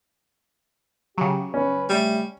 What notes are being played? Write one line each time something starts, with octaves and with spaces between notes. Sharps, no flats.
C#3 F#3 G4
C#4 B4
G3 A3